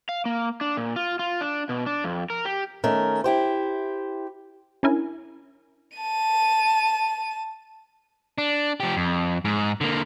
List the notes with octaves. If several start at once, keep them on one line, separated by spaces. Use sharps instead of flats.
F5
A#3
D4
A#2
F4
F4
D4
B2
D4
F2
A#4
G4
D#3 A3 C#4 A#4
E4 G4 C5
C#4 D4 E4 A#4 G#5
A5 D#7
D4
F3 G4
F2
G#2
D3 A#3